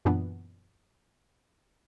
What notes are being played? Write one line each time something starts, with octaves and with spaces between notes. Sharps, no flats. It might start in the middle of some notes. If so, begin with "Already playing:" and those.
F#2 A#2 E3 B3 D4